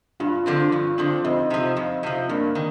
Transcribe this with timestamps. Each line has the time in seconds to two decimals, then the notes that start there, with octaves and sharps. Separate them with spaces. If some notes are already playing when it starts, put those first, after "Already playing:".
0.20 G2 D4 F4
0.46 D3 F3 C4
0.72 G2
0.98 D3 F3 C4
1.24 F2 C4 D#4
1.50 C3 F3
1.77 F2
2.03 C3 F3
2.29 G2 A#3 D4
2.55 D#3